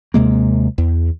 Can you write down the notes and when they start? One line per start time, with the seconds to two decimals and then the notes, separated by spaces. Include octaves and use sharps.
0.14 D#2 C3 G#3 A#3
0.78 E2